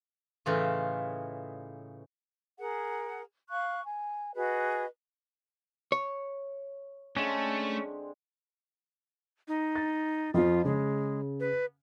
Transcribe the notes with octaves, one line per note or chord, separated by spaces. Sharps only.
A2 C#3 E3 D#4 F4
G#4 A#4 F#5
F5 C#6 F#6
G#5
F#4 G#4 B4 D#5
C#5
D3 G#3 A3 C4 C#4
D#4
A6
F2 F3 F4
C#3 G#3
B4